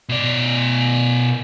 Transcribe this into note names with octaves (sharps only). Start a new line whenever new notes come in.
B2 D5